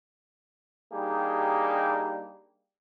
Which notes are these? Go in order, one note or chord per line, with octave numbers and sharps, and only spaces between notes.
G3 A#3 D4 D#4 G4 G#4